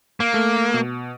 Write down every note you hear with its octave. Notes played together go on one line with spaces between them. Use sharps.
A#3
A3
B2